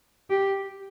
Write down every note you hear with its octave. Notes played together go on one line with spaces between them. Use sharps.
G4